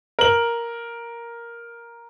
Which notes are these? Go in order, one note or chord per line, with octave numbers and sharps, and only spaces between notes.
A#4 F#7